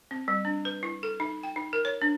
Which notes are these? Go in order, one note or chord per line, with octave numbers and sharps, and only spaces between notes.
C4
G3
D4
B4
E4
A4
D#4
G5
D#4
A#4
C#5
D4